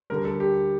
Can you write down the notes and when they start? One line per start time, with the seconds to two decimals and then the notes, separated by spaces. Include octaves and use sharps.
0.10 D2 D3 G3 A#4
0.25 A4
0.40 G4